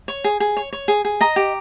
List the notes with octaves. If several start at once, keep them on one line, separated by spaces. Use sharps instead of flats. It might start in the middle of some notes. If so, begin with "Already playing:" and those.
C#5
G#4
G#4
C#5
C#5
G#4
G#4
D#5 A#5
G4